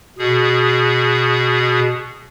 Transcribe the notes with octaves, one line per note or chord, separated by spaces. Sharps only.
B2 G#4